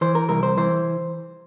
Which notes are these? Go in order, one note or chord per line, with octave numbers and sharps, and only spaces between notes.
E3 C5
A#4
C2 A#4
C5
E3 C5